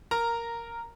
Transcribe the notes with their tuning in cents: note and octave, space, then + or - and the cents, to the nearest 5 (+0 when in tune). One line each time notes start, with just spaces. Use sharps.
A#4 +0 A#5 -5